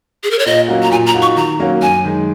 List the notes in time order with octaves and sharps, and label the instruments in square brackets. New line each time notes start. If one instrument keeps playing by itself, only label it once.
[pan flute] G#4
A#4
C#5
[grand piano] A#2 [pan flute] D#5
[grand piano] F#3 A#3 C#4 F#4
[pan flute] A#5
[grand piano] A#2 [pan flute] G#5
[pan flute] A#5
[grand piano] A#3 D#4 F#4
[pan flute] C#6
[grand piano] D#3 [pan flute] A#5
[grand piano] F#3 A#3 C#4 F#4
[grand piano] F#2 [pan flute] G#5
[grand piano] D#3 G#3